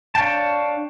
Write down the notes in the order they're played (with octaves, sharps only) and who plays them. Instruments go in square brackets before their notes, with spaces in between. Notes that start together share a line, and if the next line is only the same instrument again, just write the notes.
[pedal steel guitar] D4 C#5 F5 G5 A5